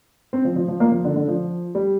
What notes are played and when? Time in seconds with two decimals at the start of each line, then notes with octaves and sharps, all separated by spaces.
0.33 C4
0.45 F3
0.56 F3
0.68 F3
0.80 A#3
0.92 F3
1.04 D3
1.16 D3
1.28 F3
1.75 G3